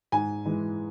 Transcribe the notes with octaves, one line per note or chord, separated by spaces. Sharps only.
G#2 G#5
E3 G#3